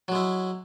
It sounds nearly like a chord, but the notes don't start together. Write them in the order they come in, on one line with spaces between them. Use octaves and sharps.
F#3 G#3 E4